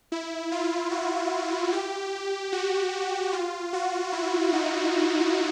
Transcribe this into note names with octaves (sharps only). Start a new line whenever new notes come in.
E4
F4
F#4
G4
F#4
F4
F#4
E4
D#4